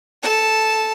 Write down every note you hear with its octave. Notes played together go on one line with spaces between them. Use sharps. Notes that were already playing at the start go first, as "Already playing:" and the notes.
A4 A5